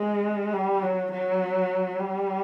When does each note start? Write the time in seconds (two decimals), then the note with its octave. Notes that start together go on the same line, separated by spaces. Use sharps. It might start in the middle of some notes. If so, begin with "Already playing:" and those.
Already playing: G#3
0.53 G3
0.82 F#3
1.12 F#3
1.99 G3